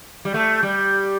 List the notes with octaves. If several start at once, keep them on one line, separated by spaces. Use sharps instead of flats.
G3
A3
G3